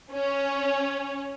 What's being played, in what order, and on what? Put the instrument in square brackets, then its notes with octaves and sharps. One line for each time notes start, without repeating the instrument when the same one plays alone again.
[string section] C#4